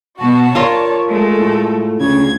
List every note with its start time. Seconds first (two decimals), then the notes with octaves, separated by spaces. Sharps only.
0.19 B2 F#4 A5
0.55 F4 A#4 C#5 D5
1.09 G#3 A3 A4
1.41 A2
2.00 D2 C#3 G#6